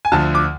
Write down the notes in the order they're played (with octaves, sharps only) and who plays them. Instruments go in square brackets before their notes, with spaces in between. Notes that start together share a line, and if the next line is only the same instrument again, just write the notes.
[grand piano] G#5
D2 D3 F3 A5
D6